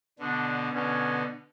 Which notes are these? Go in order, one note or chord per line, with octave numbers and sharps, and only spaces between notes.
B2 D3 D4
B2 D3 C#4